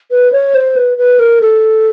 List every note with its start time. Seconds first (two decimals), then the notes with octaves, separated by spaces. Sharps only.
0.11 B4
0.32 C#5
0.55 C5
0.76 B4
0.98 B4
1.19 A#4
1.41 A4